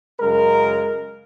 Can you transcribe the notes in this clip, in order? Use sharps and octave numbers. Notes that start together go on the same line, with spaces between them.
F#2 C#3 G#3 A#4